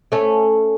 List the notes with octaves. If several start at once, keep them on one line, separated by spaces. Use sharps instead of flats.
A3 C#4